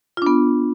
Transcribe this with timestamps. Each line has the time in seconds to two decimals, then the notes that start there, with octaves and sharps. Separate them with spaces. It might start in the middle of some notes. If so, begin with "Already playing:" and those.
0.17 F4
0.22 D4
0.26 B3